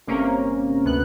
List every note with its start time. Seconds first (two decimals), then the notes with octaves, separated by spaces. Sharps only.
0.07 G1 C3 A#3 C#4 A#4
0.84 D2 B3 F#6